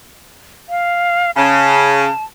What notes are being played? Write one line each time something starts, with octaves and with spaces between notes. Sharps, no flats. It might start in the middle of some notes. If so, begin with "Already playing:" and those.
F5
C#3 A5